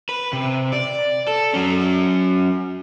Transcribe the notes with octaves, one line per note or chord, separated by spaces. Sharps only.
B4
C3
D5
A4
F#3 C#4